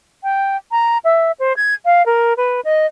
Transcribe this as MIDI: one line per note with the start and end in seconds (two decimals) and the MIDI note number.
0.23 0.57 79
0.71 0.98 82
1.04 1.32 76
1.39 1.55 72
1.56 1.74 92
1.85 2.05 77
2.06 2.33 70
2.37 2.60 71
2.65 2.86 75